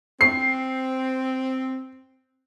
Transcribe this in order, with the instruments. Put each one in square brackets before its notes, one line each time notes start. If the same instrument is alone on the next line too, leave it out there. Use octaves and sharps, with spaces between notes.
[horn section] C4 [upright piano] C7